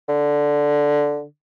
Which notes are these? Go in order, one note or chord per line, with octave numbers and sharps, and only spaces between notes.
D3